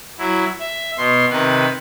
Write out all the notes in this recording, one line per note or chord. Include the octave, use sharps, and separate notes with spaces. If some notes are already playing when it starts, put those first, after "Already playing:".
F#3 E4
E5
B2 C6
C3 D#3 B4